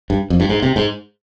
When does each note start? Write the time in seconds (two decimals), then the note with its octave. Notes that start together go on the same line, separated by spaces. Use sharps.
0.10 G2
0.30 F2
0.40 G2
0.49 G#2
0.63 C3
0.76 G#2